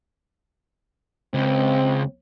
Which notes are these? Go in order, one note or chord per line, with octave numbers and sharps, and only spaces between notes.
C#2 C4